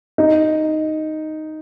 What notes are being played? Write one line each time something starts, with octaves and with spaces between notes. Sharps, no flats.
D#4